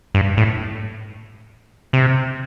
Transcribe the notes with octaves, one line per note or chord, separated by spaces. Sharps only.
G2
A2
C3